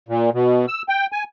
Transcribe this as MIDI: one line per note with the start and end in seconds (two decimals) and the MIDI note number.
0.09 0.30 46
0.34 0.66 47
0.68 0.82 88
0.89 1.06 79
1.12 1.24 80